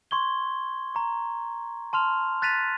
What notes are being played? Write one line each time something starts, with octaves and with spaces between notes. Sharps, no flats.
C6 C#6 G#6 G7
A#5 C#6
A5 C6 F6 F7
F#6 A6 B6 D#7 F7